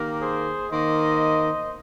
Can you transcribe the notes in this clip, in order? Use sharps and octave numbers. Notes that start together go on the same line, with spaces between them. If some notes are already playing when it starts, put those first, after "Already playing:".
Already playing: D#3 A#3 G4 A#4
G#4 C5
D#3 A#3 C5 D#5